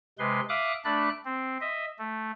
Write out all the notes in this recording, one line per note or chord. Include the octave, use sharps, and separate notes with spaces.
C3 G#3 B4 C6
E5 F5 D6 D#6 F#6
A3 D4 D5 B5 F#6
C4
D#5 E5
A3